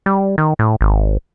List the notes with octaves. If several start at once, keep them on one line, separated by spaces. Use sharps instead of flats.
G3
D#3
A2
G#1